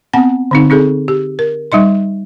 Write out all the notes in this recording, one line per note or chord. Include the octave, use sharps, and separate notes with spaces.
B3 C4 F#5 A5
D3 C4 D#4
C4 D#4 G#4 A4
G4
A#4
G3 D#4 D#5 C6